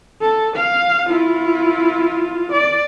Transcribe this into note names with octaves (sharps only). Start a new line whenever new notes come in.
A4
F5
E4 F4
D5